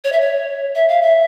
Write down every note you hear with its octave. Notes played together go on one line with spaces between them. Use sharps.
C#5
E5
C#5
E5
F5
E5